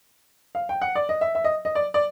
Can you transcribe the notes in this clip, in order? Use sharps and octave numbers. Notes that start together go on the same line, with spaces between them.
F5
G5
F#5
D5
D#5
E5
E5
D#5
D#5
D5
D5